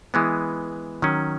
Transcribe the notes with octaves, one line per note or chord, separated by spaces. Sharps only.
E3 G#3 B3
D#3 F#3 C#4